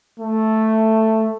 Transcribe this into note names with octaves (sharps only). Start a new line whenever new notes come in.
A3